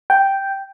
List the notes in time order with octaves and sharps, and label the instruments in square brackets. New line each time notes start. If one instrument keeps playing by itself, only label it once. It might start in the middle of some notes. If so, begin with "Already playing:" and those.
[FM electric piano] G5